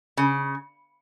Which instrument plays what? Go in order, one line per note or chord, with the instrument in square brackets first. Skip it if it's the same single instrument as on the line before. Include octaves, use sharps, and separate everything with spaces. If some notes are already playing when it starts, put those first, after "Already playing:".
[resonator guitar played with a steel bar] C#3